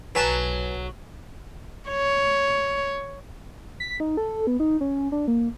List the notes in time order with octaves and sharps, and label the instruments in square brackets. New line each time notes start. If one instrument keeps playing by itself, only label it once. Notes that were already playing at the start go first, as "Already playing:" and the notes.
[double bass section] B1 [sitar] F#3 [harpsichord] B4 G#5 A5
[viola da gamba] C#5
[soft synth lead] B6
D#4
A4
B3
D#4
C#4
D4
A#3